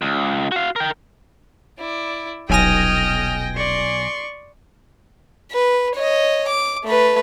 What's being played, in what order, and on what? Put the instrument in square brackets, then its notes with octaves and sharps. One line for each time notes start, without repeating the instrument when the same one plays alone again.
[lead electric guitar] C#2
F#4 F5
A#4 G5
[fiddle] E4 D5
[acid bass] D#1 [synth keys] B1 G#5 A#6 [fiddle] D#5 G5 [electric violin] D#6 F6
[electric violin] D5 C#6 [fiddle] C6
[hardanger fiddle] B4
C#5 D#5
D6
A3 B4